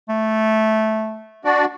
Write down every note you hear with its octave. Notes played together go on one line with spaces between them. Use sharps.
A3
D4 F#4 D5